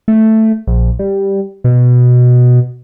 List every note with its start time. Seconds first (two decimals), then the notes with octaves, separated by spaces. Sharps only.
0.08 A3
0.67 A#1
0.99 G3
1.64 B2